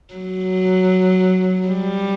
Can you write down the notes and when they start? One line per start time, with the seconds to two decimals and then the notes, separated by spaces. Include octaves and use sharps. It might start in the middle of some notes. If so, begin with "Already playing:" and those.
0.14 F#3
1.68 G3